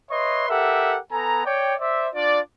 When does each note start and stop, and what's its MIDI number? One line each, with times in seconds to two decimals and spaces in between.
0.11 0.48 71
0.11 0.48 73
0.11 0.48 75
0.11 0.48 76
0.11 0.48 84
0.49 0.98 67
0.49 0.98 69
0.49 0.98 70
0.49 0.98 76
0.49 0.98 78
1.12 1.42 59
1.12 1.42 69
1.12 1.42 80
1.12 1.42 82
1.45 1.74 73
1.45 1.74 74
1.45 1.74 79
1.80 2.08 72
1.80 2.08 74
1.80 2.08 76
2.14 2.40 62
2.14 2.40 65
2.14 2.40 74